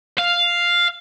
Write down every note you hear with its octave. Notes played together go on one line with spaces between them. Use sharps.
F5